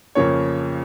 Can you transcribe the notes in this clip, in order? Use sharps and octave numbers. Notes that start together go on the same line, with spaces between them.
F2 C#3 F3 A#3 C#5